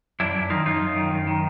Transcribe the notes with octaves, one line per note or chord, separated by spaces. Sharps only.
F#2 D4 E4
F#2
D#3 D#4 F4
F#2 D#4 F4
F#2
D#3
F#2
D#3